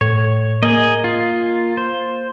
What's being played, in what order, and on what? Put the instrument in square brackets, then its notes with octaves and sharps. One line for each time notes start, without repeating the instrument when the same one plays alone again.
[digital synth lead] A2 [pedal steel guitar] C#5
[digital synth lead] A#3 [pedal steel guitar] G#4 D#5
[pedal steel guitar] F4
C5